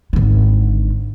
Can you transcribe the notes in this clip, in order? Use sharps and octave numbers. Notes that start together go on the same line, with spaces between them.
G#1 D3